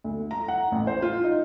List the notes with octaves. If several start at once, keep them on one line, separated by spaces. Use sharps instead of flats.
D2
A#5
F#5
A1
C5
F4
D#4